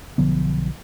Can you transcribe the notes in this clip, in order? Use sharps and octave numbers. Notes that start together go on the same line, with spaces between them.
B1 D3 F3 B3